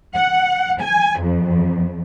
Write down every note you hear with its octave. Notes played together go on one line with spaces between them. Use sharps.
F#5
G#5
F2